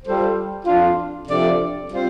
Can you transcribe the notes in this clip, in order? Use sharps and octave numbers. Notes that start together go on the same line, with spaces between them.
G3 F4 A4 C5
F2 F3 D4 F4
C3 F3 D4 A4 D5
G3 C4 F4 C5